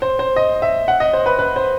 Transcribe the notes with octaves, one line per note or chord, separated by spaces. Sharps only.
C5
C5
D#5
E5
F#5
D#5
C5
B4
B4
C5